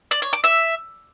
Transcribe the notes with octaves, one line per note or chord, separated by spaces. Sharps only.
D5
C#5
D6
E5